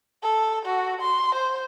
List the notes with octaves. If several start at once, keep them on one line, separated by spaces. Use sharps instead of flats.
A4
F#4
C6
C5